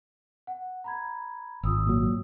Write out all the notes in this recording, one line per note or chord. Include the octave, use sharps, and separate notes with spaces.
F#5
A#5 B5 G#6
G#1 F4 D#6 E6
A#2 F#3